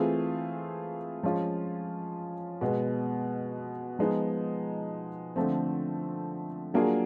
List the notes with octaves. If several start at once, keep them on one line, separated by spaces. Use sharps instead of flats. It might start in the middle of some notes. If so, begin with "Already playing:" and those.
Already playing: E3 A3 C4 F4 G#4
F3 G#3 C#4 F4
B2 G#3 B3
F3 G#3 B3 D#4
D3 F3 A3 C4
F#3 A#3 D4 F4 G#4